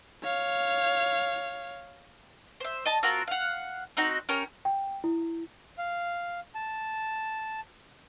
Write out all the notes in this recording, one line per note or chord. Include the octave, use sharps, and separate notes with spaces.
C#5 F5
C5 E5
D#5 A5
C4 F4 F#4 A#4
F5 F#5
C4 D#4 F#4
C#4 G4 A#4 C#5
G5
E4
F5
A5